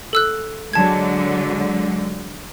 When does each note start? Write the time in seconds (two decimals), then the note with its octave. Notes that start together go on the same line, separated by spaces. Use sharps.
0.13 A4 E6 F#6
0.73 D3 F#3 G#3 A5 G#6